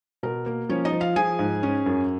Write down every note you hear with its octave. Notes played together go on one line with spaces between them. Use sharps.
B2 A#4
A#3
F3 C#4 C#5
D#4 D#5
F3
F4 F5
F3 G#4 G#5
G#2
C#4
F#2